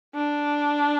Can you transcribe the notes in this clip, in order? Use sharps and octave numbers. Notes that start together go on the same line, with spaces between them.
D4